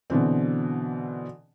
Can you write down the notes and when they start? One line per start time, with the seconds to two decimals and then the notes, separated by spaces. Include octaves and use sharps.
0.10 B2 D3 E3 C4